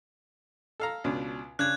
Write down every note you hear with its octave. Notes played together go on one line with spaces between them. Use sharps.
A4 F5 A#5
C#2 B2 D4
C#3 D4 F#6 G#6